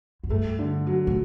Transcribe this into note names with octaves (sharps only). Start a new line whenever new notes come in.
F#2
G2 A3
D3
F#3
A2